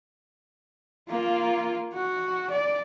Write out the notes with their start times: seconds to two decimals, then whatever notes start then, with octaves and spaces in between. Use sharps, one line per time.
1.09 A#3 F4
1.93 F#4
2.50 D5